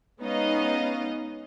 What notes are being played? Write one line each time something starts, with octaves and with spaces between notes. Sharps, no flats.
G#3 B3 C#4 D#4 D#5 F5